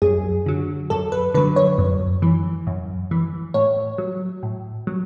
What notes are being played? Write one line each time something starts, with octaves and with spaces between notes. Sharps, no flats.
F#2 G#4
D3 F#3
F#2 A4
B4
D3 F#3 B4
C#5
F#2
E3
F#2
E3
A2 C#5
F#3
A2
F#3